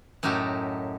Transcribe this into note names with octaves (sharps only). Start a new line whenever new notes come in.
F#2 A2 D#4 F#4 G4 A4